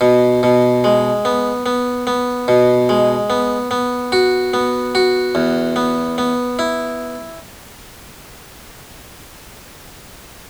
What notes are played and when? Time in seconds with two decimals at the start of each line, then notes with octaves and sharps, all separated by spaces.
0.01 B2
0.43 B2
0.84 G#3
1.25 B3
1.66 B3
2.07 B3
2.48 B2
2.89 G#3
3.30 B3
3.71 B3
4.12 F#4
4.54 B3
4.95 F#4
5.35 E2
5.76 B3
6.18 B3
6.59 E4